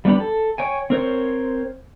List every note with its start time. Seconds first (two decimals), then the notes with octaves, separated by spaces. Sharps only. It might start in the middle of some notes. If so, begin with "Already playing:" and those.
0.05 G3 B3 D4 G4 B5
0.20 A4
0.58 C#5 G5 G#5
0.90 C4 A#4 C5 C#5